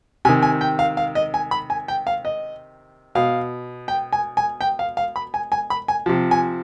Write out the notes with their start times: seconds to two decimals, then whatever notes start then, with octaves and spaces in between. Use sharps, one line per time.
0.25 C3 D#3 G#5
0.43 G#5
0.61 G5
0.79 F5
0.97 F5
1.15 D#5
1.34 G#5
1.51 B5
1.70 G#5
1.88 G5
2.07 F5
2.25 D#5
3.15 B2 F5
3.88 G5
4.12 G#5
4.37 G#5
4.61 G5
4.79 F5
4.97 F5
5.16 B5
5.34 G#5
5.52 G#5
5.70 B5
5.88 G#5
6.06 C3 F3
6.31 G#5